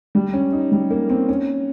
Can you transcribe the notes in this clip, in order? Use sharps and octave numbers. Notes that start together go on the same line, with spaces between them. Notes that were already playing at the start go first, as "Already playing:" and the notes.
G3
C#4
D#4
G3
A#3
C4
C#4